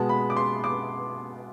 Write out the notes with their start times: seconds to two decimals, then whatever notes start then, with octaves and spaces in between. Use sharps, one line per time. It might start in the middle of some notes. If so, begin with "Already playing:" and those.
Already playing: B2 G#3 B3 A5
0.09 B5
0.30 D6
0.37 C6
0.64 D6